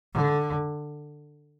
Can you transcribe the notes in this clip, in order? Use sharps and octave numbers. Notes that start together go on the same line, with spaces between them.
D3